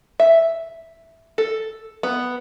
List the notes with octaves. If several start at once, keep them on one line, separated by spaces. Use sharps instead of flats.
E5
A4
B3